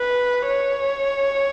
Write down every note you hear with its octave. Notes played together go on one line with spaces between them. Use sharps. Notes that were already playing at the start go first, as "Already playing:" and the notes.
Already playing: B4
C#5